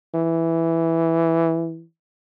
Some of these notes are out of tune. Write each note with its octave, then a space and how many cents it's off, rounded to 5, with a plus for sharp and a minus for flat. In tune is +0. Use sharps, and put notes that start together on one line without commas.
E3 +0